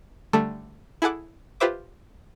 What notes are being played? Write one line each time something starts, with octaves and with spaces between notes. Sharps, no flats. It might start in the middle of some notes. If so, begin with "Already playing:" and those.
D3 G3 A3 A4
E4 G#4 A4 F#5 D6
F4 G4 B4 C5 E5 D6